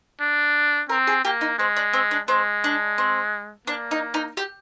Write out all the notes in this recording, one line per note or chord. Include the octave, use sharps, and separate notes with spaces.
D4
C4 A#4
G#4
A#3 G4
D#4
G#3 C4
D4
C4
D4
G#3 C4
D4
C4
A#3 D4
D#4
D#4
G4